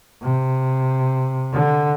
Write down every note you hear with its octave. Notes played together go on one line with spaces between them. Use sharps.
C3
D3